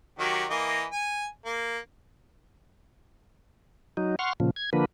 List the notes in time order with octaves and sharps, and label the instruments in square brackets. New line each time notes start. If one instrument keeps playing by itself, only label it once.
[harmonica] D#3 F#3 G4
E3 A#3 D#5
G#5
A#3
[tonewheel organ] F#3 D#4
F#5 C6 C#6 F6
A#2 C#3 F3
G#6
D3 F3 A#3 B4